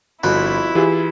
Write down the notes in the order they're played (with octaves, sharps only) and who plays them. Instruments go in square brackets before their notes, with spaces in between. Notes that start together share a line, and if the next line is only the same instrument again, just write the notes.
[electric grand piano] G1 [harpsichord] F2 F#4 B5 [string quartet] E4
[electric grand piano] E3 F4 G#4 [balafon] G4